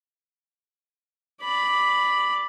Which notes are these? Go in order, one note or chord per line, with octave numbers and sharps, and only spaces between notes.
D5 B5